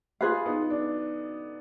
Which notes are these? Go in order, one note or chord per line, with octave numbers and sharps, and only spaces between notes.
F4 G#4 B4 F5
B3 D#4
D4